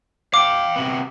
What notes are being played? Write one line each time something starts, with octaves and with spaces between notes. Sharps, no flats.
F5 G5 D6
C3 B3